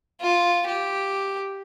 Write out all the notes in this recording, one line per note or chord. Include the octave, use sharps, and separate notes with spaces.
F4
G4